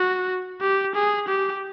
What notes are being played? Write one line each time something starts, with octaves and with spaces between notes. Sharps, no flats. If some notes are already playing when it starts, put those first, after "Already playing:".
Already playing: F#4
G4
G#4
G4